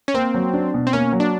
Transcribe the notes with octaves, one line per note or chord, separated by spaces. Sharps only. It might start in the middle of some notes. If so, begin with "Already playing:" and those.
C#4
A#3 C4
F#3
D4
B2
C4
A#3 C#4
F#3
D4